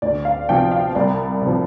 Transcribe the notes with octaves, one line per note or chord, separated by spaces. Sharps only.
D2 D5
F5
C3 F3 G5
F5
C2 D5
C3
F3